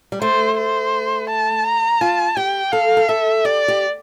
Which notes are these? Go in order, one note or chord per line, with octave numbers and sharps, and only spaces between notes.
G3
A3 C5
C5
A5
A#5
F4 A5
G4 G5
A4 F5
A4
A4 E5
G4 D5
G4